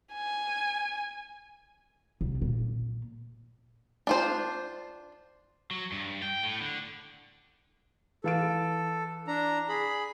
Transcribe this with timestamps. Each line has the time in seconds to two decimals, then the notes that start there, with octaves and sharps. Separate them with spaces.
0.13 G#5
2.21 C2
2.42 A#2
4.07 D4 F4 C5
5.71 F#3
5.92 G2
6.22 G5
6.43 A2
6.61 D3
8.24 E3 A4 F5 D7
9.28 D4 A#5
9.69 G#4 B5